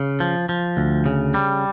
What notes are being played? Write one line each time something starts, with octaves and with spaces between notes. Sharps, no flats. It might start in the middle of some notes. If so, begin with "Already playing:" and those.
Already playing: C#3
F3
F3
D2
C#3
G3